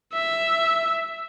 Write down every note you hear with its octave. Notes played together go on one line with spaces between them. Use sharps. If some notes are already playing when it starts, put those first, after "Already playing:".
E5